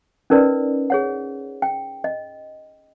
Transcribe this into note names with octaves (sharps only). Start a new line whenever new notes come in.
C#4 D#4 A#4 B4 D5 D#5
G#4 C#5 F#5
G5
D#5